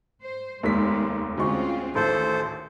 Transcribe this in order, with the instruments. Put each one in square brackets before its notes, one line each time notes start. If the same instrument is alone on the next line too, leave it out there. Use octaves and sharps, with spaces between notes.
[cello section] C5
[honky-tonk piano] F1 D#2 [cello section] G#3 B3 [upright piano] A#3 B6
[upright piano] D2 G#3 C#6 [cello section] C4 C#4 F4
[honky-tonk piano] A1 [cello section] D#3 [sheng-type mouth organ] A4 C5